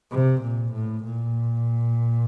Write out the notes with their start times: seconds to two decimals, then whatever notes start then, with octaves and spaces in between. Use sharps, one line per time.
0.11 C3
0.42 A#2
0.73 A2
1.04 A#2